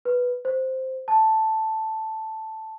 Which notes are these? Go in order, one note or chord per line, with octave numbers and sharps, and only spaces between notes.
B4
C5
A5